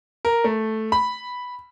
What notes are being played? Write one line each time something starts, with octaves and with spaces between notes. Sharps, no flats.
A#4
A3
B5